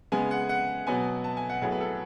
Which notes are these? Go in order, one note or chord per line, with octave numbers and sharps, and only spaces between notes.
C#3 G#3 B3 G#5
F#5
F#5
B2 F#3 B3 G#5
A5
G#5
F#5
A2 F#3 B3 G#4
B4
A4